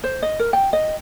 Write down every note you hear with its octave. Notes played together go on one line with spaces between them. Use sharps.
C5
D#5
A#4
G5
D#5